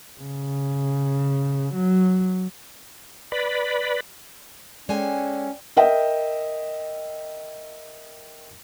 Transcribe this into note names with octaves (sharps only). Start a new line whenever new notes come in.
C#3
F#3
B4 D5 B5
G#3 C#4 A4 D5 G5 G#5
A#4 D#5 E5 G5